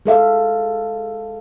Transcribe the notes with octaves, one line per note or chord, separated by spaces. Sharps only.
G#3 A4 E5 F5